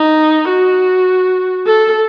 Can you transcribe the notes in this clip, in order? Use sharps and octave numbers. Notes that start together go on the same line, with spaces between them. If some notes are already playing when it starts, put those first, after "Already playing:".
Already playing: D#4
F#4
A4